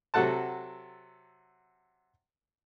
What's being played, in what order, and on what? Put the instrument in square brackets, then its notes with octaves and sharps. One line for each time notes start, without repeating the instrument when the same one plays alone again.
[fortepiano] C3 F#3 A4 F#5 A5